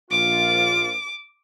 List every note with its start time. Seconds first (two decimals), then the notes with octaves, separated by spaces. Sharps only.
0.11 A#1 F4 D6